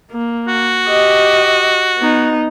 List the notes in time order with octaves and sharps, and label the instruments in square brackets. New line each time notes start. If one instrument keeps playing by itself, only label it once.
[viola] A#3
[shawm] F#4
[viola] G4 D#5
B3 D#4